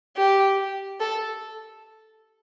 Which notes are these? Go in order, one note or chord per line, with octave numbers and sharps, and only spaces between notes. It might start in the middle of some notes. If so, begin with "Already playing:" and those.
G4
A4